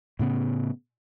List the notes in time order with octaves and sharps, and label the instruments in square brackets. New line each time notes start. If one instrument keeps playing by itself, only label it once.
[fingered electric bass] A2 C#3 B3